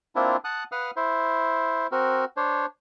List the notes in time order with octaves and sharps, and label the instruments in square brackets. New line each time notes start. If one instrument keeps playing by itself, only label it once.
[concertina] A#3 C4 D4 E4 F4
F#5 A5 D#6 F#6
B4 F5 F#5 D#6 F6
E4 C5
C4 F#4 A#4
D4 C5 C#5